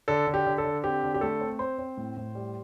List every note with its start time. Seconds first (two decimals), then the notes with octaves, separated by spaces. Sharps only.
0.08 D3 A4
0.27 D3
0.34 G4
0.47 D3
0.58 A4
0.65 D3
0.84 C4 G4
1.03 D3
1.14 G4
1.21 A3 A4
1.41 C4
1.59 C4 C5
1.78 C4
1.97 A2
2.17 A2
2.35 G3